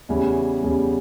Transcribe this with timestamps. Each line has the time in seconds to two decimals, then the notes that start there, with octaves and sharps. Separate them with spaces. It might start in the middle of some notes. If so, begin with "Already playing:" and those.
0.09 E2 C#3 E3 G3
0.63 E2 C#3 E3 G3